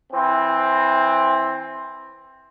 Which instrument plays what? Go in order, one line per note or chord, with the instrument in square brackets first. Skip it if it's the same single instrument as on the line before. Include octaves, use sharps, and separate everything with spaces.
[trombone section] E3 C4